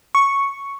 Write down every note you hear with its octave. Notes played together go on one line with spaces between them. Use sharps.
C#6